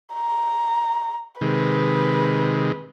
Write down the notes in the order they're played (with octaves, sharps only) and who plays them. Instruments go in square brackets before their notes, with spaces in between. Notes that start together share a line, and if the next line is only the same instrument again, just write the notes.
[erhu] A#5
[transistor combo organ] C3 D#3 G#3 [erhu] B4